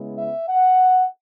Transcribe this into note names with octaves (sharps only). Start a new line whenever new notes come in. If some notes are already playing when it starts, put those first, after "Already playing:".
Already playing: C#3 G#3 B3 E4
E5
F#5